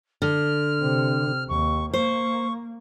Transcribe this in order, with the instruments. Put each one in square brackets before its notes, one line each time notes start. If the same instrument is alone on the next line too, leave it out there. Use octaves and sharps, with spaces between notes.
[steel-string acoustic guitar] D3 [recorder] F6
[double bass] C3
[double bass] D#2 [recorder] C#6
[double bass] A#3 [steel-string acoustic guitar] C5 [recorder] C#6